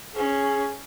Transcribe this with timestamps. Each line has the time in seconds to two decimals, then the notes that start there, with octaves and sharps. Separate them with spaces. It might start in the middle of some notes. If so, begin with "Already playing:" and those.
0.15 C#4 G#4